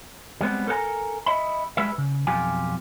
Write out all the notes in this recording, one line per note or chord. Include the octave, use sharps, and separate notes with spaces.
G3 G#3 B3 C4
A4 A#4 C5 F#5 G#5 A#5
D#5 E5 B5
G3 G#3 B4 E5
C#3
B1 F2 F4 G4 G#5